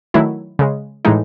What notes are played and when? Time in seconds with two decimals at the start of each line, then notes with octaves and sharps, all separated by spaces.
0.14 D#3 F#3 A3 E4
0.59 C#3 G#3
1.05 A2 E3 G#3 D#4